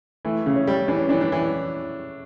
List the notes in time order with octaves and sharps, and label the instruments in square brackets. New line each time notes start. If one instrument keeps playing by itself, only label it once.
[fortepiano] E3 [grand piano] A3
[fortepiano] C#3
[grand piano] C#4
[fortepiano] G3
[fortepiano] E3 [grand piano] D4
[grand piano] C#4
[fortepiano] E3 [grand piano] D4
[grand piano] D4
[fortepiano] E3